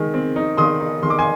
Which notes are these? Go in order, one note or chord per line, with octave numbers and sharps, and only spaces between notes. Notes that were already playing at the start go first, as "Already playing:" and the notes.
Already playing: D#3 G#3
C4
D#4
D#3 C6 D#6
D#4
D#3 C6
D6
G#5 C6